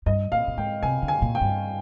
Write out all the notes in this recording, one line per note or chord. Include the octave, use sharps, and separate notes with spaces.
G2 D#5
A#2 F5
A#2
G#2 G5
C3 G#5
D3
G#5
A#2
G5
G2